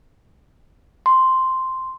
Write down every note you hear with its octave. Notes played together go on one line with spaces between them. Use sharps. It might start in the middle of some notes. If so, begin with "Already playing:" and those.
C6